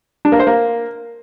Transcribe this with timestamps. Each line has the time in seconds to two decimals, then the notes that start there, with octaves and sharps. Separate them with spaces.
0.25 D4
0.32 A#3
0.39 C5
0.47 A#3